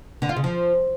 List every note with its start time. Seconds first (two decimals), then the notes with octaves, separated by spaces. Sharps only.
0.22 D3
0.29 F4
0.36 C#3
0.44 F3